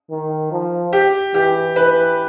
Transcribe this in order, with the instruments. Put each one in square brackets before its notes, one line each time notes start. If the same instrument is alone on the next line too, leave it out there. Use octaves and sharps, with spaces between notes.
[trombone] D#3
F3
[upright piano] G4
[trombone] E3 [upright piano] G4
[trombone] E3 [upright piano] B4